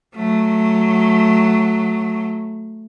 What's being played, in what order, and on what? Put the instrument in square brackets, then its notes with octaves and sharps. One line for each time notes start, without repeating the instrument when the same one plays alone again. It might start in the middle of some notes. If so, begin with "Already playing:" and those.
[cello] F#3 A3